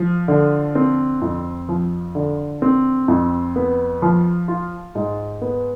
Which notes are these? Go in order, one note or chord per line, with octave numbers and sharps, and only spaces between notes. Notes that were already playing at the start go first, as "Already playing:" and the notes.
Already playing: F3
D3
C4
F2
F3
D3
C4
F2
B3
F3
F4
G#2
B3